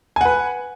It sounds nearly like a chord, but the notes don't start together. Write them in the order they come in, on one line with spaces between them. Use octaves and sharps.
G#5 F#5 B4